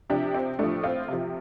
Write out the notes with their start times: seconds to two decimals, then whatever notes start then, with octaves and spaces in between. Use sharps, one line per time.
0.10 C3 F3 D4 G4
0.34 C4
0.59 A2 F3 A3 D4
0.83 C4 F4
1.08 C3 F3